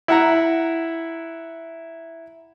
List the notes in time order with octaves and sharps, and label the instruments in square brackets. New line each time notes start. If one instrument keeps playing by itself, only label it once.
[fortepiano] E4 F#5 A#5